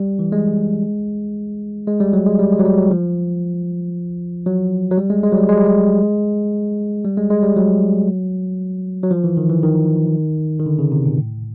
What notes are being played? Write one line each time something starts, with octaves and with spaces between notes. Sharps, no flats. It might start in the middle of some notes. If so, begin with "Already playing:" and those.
Already playing: G3
E3
G#3
G#3
G3
F#3
G#3
G3
G#3
F#3
G3
F#3
F3
F#3
F#3
G3
G#3
G#3
F#3
G3
G#3
G3
G#3
G3
G#3
G#3
G3
F#3
F#3
F3
E3
D#3
E3
D#3
D#3
D3
C#3
C3
A#2
A2